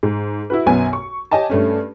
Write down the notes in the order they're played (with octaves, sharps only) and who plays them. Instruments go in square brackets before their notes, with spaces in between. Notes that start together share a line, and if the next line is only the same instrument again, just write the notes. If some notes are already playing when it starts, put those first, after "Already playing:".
[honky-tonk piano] G#2
E4 F#4 B4
B1 F#2 B3 G#5
C#6
G4 C#5 D#5 G#5 A5
G2 A3 C#4